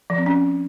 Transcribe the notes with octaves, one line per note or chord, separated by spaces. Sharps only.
F3
C4
C#4